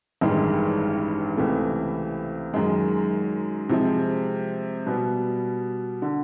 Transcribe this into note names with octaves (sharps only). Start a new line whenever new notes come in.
A1 G2 D#3 G#3
C#2 C3 E3 A3
F#2 D#3 G#3
C3 F3 G#3
B2 G3 B3
D3